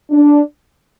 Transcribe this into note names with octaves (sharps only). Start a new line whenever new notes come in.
D4